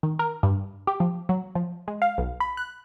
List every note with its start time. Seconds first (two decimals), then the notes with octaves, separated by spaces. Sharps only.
0.03 D#3
0.19 A#4
0.43 G2
0.87 G4
1.00 F3
1.29 F#3
1.55 F3
1.88 G#3
2.02 F5
2.18 B1
2.40 B5
2.57 F#6